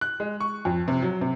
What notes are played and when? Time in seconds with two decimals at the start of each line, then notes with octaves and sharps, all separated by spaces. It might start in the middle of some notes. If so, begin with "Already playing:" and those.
0.01 F#6
0.20 G#3
0.40 C#6
0.65 F2
0.88 C3
1.02 F#3
1.21 C3